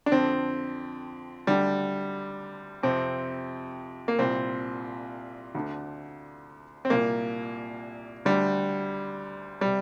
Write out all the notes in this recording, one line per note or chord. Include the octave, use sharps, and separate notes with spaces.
D4
F2 D3 C4
D2 D3 G3
F2 C3 C4
A#3
C2 A#2 C4
D2 D3
C4
C2 A#2 A#3
D2 D3 G3
C3 G3